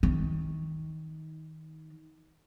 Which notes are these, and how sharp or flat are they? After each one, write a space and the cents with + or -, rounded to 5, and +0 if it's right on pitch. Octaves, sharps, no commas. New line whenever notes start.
D#3 +20